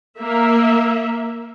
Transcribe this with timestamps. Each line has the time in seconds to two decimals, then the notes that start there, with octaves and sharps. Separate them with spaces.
0.18 A#3 E5